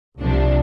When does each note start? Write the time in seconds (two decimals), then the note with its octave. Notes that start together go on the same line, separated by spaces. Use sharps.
0.20 C2 C3 F3 D4